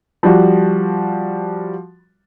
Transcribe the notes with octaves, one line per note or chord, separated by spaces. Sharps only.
F3 G3 F#4